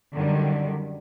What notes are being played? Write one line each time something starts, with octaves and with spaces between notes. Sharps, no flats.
F#2 D3 D#3 G3